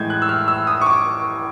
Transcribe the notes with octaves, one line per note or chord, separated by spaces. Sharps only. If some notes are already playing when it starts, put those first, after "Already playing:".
Already playing: A2 E3 G#3 G6 G#6
F#6
E6
F6
E6
D#6
C#6
D6